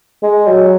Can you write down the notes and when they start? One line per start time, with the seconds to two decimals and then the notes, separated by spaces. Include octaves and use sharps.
0.23 G#3
0.48 F#3